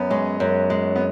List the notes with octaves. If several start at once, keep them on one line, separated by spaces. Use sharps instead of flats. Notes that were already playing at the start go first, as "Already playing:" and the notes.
Already playing: F#2 B3
G#3 C#4
F#2
G#3
B3